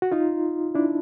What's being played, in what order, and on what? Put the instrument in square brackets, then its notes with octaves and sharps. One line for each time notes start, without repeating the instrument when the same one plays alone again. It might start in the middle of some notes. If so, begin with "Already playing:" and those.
[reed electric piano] F#4
D#4 F4
D4 E4